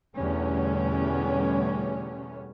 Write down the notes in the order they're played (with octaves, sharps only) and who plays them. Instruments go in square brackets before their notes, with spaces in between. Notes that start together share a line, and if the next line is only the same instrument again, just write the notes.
[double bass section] E2 B2 D3 G3 A3 C#4